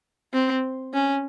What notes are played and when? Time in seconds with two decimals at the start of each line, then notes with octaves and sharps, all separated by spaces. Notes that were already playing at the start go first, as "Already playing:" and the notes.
0.33 C4
0.94 C#4